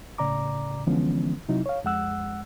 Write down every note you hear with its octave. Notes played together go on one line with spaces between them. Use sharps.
A2 C#3 D5 A#5 D6
D3 E3 F3 G#3 B3 C#4
C3 F#3 D#4 E4
C#5 F5
F2 G#3 F#5 E6 F#6